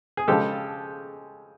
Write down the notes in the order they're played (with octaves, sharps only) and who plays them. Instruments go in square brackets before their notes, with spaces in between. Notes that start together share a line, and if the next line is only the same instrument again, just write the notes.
[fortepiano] G#4
C#3 F3 G#3 G4 A4